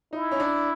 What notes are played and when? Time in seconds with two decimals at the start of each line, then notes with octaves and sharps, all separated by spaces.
0.13 D#4 E4
0.31 C#4
0.40 D4